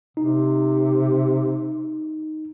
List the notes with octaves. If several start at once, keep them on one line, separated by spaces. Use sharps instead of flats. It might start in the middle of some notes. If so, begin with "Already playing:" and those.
C3 D#4